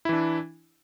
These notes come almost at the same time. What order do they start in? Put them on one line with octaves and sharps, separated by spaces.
E4 E3 D4